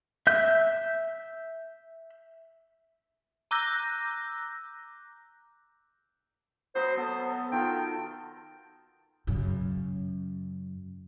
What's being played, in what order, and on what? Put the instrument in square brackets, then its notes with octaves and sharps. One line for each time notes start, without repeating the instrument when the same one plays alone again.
[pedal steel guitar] E5 G6
[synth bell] A#5 D6 E6 F#6 G6 A#6
[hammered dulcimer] F#3 B3 [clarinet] C5
[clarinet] B3 [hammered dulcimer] A4
[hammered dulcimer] D#3 F4 A4 [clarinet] G5
[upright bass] F#2 C#3